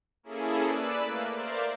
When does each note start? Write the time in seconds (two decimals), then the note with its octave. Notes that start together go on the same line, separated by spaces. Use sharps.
0.23 A#3 C#4 E4 G#4 A4
0.63 B4 D5 E6 F#6
1.03 A3 A#3
1.34 A#4 C5 D5 E5 F5